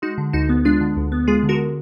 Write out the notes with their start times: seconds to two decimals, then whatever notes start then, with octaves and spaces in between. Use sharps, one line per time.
0.02 G#3 D#4 F#4
0.18 D3
0.33 D2 D#4 F#4
0.49 B3
0.65 G#3 D4 F4
0.81 D3
0.97 D2
1.12 B3
1.27 G#3 F4 G#4
1.43 D3
1.49 F#4 A#4